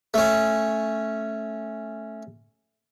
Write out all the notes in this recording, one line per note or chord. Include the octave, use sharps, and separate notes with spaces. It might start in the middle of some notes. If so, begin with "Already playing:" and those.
A3 C#4